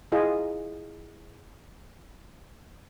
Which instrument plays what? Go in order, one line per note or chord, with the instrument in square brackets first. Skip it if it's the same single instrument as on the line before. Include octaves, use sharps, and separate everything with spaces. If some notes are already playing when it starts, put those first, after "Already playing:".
[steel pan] E4 F4 G#4 D#5